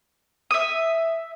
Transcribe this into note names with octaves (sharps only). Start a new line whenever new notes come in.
E5 D#6